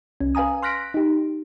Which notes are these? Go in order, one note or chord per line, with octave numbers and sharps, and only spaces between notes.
C2 C#4
B4 F5 G#5 A#5 D#6
C6 F6 F#6 A#6 B6 D7
D#4 G4